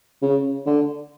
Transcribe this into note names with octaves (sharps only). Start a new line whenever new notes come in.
C#3
D3